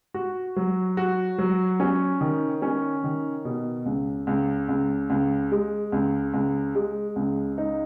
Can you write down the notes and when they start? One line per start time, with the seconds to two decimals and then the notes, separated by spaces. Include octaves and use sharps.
0.14 F#4
0.56 F#3
0.97 F#4
1.38 F#3
1.80 C#4
2.21 D#3
2.62 C#4
3.04 D#3
3.45 B2
3.86 C#2
4.27 C#2
4.69 C#2
5.10 C#2
5.51 G#3
5.92 C#2
6.34 C#2
6.75 G#3
7.16 C#2
7.58 D#4